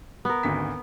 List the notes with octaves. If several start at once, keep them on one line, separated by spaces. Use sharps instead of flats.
B3 A#4
G#1 D2 B6